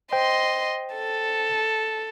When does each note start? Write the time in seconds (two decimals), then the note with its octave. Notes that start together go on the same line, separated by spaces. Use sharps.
0.13 C5 D#5 G5 C6
0.94 A4